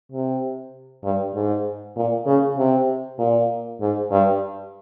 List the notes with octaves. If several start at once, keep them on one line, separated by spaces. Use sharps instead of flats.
C3
G2
G#2
A#2
C#3
C3
A#2
G#2
G2